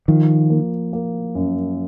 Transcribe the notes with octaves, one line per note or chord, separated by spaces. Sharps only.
D#3 F3
A#3
A#3
F#2